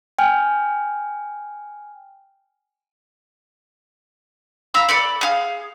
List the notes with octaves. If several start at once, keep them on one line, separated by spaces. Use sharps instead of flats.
G5 G#5 F6
F5 A#5 B5 E6
A4 D5 B5
G#4 F5